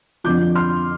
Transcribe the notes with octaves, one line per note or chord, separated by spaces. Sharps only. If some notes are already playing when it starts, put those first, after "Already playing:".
F2 D3 F3 D6 G6
C6 F6